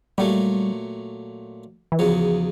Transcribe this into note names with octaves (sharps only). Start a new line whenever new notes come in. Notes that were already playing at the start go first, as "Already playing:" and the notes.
A#2 F#3 G3 A3
E3
E2 C#3 F3 F#3